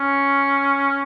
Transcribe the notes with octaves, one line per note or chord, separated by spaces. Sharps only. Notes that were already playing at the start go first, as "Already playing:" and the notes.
Already playing: C#4